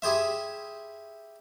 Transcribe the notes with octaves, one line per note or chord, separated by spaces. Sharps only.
E4 G4 G#4 C5 E5